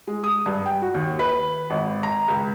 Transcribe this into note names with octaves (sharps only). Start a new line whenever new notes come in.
G#3
D#6
G2
G5
F#4
D#2
B4
G#1
A#5
C#2